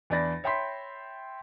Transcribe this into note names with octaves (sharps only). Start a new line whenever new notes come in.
E2 D4 D5 B5 A6 A#6
C#5 E5 G5 B5 C6 B6